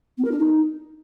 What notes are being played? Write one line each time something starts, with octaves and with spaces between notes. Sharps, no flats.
B3
A#4
D4
D#4